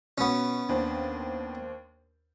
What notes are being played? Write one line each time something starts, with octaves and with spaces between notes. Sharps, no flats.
B2 B3 C#4
D#2 D4 C5